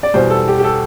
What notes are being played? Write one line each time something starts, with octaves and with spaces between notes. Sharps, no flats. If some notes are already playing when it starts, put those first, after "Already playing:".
D5
E2 B2 G3 C5
A4
G4
G4
A4